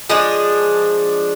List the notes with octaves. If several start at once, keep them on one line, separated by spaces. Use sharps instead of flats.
F3 G#3 D4